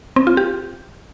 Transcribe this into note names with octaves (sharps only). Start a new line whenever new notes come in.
C4
F4
G4